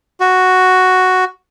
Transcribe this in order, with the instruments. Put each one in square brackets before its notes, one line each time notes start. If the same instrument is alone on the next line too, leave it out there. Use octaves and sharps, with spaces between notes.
[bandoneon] F#4